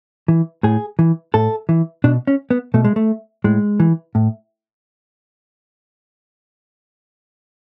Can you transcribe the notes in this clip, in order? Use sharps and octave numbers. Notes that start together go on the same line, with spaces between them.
E3
A2 G#4
E3
A2 A4
E3
B2 D4
C#4
B3
B2 A3
G#3
A3
A2 G#3
E3
A2